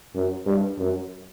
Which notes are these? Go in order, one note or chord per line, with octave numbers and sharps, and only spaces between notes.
F#2
G2
F#2